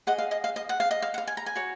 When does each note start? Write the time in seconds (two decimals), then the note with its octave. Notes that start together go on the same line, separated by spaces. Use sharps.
0.07 G#4 D#5 F#5
0.18 F5
0.31 D#5
0.44 F5
0.56 D#5
0.69 F#5
0.80 F5
0.91 D#5
1.02 F5
1.14 F#5
1.18 F5
1.27 G#5
1.37 A#5
1.46 G#5
1.55 F#4 C#5